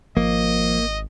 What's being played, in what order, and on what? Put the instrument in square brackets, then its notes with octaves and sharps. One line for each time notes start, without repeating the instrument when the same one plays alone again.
[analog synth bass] G#1 [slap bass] F3 [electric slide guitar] A#3 [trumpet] D#5